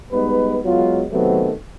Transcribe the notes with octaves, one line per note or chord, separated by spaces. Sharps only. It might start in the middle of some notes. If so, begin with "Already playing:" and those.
G3 G#3 B3 D#4 B4
F#3 G#3 B3 F4
C3 D#3 F#3 A3 B3 C4